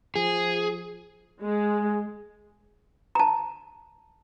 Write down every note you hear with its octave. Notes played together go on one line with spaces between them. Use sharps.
F3 G#4
G#3 G#4
A5 A#5